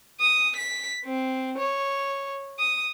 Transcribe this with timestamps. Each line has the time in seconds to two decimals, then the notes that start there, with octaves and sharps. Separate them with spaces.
0.21 D#6
0.57 B6
1.05 C4
1.58 C#5
2.59 D#6